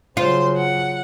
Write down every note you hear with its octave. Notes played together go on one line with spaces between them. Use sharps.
C#3 F#3 F4 C5 C6
F#5